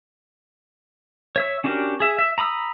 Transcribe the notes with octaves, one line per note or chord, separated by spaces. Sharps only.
C#5 E5 E6
C#4 D4 F#4 G4 A#4
G#4 E5
E5
A#5 B5 D#6 E6